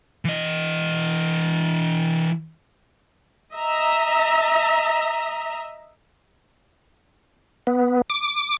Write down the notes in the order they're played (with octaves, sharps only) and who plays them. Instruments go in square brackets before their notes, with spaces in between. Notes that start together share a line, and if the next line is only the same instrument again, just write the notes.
[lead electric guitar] E3 D#5
[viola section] D#5 E5 A#5
[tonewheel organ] B3
D6